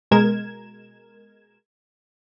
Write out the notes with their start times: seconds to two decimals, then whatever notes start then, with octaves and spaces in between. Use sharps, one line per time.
0.11 B2 G#3 A#4 G#6 E7